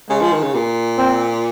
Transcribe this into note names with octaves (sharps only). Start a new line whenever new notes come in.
C#3 G#3
F3
D#3
C#3
A#2
C4